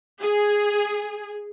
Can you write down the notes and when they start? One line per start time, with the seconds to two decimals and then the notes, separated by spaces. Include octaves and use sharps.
0.20 G#4